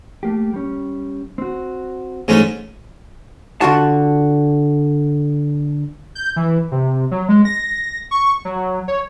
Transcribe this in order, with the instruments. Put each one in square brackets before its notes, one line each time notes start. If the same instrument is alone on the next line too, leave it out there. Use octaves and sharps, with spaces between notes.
[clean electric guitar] A3 A#3 G4
G3 C#4
C4 F#4
[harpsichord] G#2 A3 C#4 [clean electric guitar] E3 F#3 C4
[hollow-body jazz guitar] D3 F4 F#4 A5
[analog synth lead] G6
E3
C3
F#3
G#3
A#6
C#6
F#3
C#5